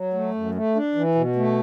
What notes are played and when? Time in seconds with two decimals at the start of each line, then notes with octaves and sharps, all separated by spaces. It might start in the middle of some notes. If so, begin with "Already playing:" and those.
Already playing: F#3
0.14 A3
0.34 F#2
0.55 A3
0.75 D4
0.95 E3
1.15 B2
1.36 A3